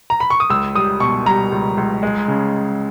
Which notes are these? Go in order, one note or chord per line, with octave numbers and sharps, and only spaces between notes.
A#5
B5
C#6
D#6
C#2 E6
G3 D#6
B2 C#6
G3 A#5
C#2
C#2
G#3
C#3